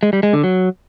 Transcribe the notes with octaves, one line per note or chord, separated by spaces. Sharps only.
G#3
G3
G#3
D3
F#3